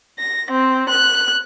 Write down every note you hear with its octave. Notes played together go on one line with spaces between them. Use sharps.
A#6
C4
F#6